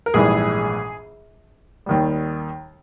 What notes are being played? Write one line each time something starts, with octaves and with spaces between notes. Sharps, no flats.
A#4
A#1 G#2 E3 G3 G#4
D#2 D#3 G3